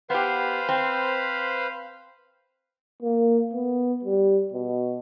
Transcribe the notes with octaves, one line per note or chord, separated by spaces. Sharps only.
B3 G4 B4 C5 F5
C4
A#3
B3
G3
B2